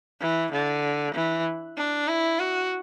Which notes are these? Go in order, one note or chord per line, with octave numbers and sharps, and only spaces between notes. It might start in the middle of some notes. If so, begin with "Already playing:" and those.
E3
D3
E3
D4
E4
F#4